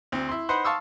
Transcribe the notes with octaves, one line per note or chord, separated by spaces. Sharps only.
D2 C4
E4 C6
D#4 B4 C5 F#5 C6
F5 A5 C6 C#6 D#6 E6